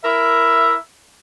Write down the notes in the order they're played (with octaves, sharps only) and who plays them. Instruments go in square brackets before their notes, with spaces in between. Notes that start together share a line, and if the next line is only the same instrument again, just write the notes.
[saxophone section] E4 A#4 E5